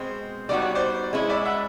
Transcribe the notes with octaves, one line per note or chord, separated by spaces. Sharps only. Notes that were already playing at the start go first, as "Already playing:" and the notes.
Already playing: B2 G#3 C4 C5
G3 B3 D#4 F#4 D5
C#5
C5 D5
G#3 C#4 E4
D5 E5
E5 F#5